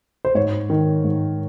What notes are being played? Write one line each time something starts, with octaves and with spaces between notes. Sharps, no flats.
C5
G#2 C#5
D#3
G#2